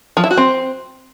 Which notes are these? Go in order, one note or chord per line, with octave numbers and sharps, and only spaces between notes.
F3
E4
F#4
C4